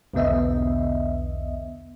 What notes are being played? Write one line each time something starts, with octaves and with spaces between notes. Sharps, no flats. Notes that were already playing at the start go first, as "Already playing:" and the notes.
B1 E2 D3 B3 D#5 E5